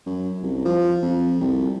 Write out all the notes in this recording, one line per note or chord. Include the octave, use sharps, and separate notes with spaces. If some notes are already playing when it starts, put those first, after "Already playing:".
F#2
C2
F3
F2
C2